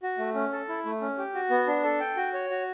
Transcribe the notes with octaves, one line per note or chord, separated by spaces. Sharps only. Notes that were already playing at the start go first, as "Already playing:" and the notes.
F#4
A3
C#4
A4
E4
A3
C#4
G4
F#4
B3
D4
A4
G5
F#4
C#5
F#4